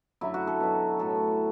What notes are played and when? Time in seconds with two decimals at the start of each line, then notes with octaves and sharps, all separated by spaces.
0.21 F#2 D3 F#3 E4
0.34 F#4
0.47 A4
0.60 B2 F#3
0.99 A2 F#3 A4